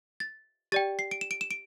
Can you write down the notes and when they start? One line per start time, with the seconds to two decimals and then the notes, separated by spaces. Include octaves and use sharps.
0.20 A6
0.72 G4 D5 G5 A6
0.99 C7
1.11 D7
1.21 E7
1.31 D7
1.41 E7
1.51 D7